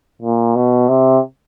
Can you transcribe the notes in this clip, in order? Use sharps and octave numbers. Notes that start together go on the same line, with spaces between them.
A#2
B2
C3